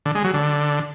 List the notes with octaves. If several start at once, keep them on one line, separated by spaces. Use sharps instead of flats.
D3
G#3
F#3
D3